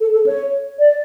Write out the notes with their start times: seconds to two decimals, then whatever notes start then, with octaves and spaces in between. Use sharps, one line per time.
0.01 A4
0.13 A4
0.26 C#5
0.79 D5